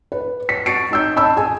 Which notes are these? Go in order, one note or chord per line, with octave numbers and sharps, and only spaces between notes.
B4
B6
C#6 A6 C7 D7
D#4 E6 G6
D#5 A5 B5 E6 G6
G#4 G#5